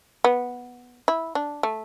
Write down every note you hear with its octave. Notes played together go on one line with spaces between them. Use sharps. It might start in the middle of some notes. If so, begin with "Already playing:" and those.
B3
E4
D4
A3